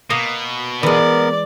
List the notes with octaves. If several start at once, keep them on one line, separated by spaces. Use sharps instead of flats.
B2 A#3 D#5 F5
E3 G#3 B3 A#4 D5